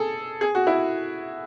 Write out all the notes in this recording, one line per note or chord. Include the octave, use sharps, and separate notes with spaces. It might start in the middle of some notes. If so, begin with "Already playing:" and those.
Already playing: G#4 A4
G#4
F#4
E4